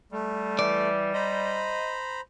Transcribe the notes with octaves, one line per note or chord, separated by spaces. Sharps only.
G3 A3
E3 D5
C5 D#5 A#5 B5